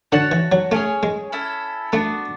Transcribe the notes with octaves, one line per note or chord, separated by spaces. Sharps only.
D3 F#4 C#5 F#5 A5
E3
F#3
A3 C#4 G#4 C#5
G#3
C#4 E4 A4 E5
A3 B3 D4 F#4